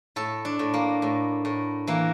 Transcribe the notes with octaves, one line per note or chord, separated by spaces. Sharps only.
A2 A4
D4
A2
A#3
A2
A2
E3 A#3